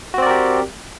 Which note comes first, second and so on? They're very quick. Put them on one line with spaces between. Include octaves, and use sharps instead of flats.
F#4 C4 D5 A#4 G4